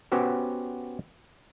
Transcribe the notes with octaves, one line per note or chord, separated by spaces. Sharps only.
B3 C#4 F#4 G4 C5